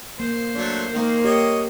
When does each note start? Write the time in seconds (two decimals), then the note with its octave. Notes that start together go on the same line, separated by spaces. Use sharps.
0.20 A#3 C5
0.55 F#3 A3 D4
0.93 D#3 A#3
1.24 G4 C#5 D#5